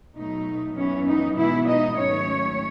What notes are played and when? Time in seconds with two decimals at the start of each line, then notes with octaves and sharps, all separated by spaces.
0.16 B2 F#3 A3 D#4
0.77 F#2 E3 B3 C#4
1.07 D#4
1.37 B2 E3 G#3 B3 E4
1.67 D#4 D#5
1.97 G#2 D#3 F#3 A3 C#4 C#5